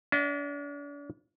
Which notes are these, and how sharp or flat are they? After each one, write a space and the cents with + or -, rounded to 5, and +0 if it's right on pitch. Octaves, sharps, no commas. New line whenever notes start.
D4 -40 D#5 +30 F#5 +0